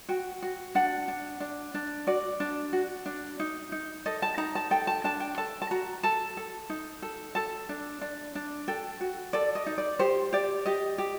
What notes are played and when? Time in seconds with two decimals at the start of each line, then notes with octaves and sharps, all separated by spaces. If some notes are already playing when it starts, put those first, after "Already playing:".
0.09 F#4 G5
0.42 F#4
0.75 D4 F#5
1.08 D4
1.40 D4
1.74 D4
2.07 F#4 D5
2.40 D4
2.73 F#4
3.06 D4
3.40 D#4
3.72 D#4
4.06 A4 D#5
4.22 A5
4.38 D#4 A#5
4.55 A5
4.71 A4 G5
4.87 A5
5.04 D4 A5
5.20 G5
5.38 A4 A5
5.62 A5
5.71 F#4 A#5
6.03 A4 A5
6.37 A4
6.70 D#4
7.02 A4
7.35 A4 A5
7.69 D4
8.01 D4
8.35 D4
8.68 A4 G5
9.01 F#4
9.33 A4 D5
9.55 D#5
9.66 D#4
9.78 D5
9.99 G4 C5
10.33 G4 D5
10.66 G4 D#5
10.98 G4